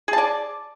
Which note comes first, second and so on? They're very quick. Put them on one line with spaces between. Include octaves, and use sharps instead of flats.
G#4 A5 D5